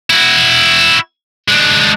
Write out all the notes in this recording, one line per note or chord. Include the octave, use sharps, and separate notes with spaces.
E4 F#4
G#3 D4